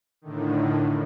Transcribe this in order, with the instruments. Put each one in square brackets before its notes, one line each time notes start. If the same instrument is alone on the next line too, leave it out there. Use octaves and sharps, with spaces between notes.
[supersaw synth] A2 D3 D#3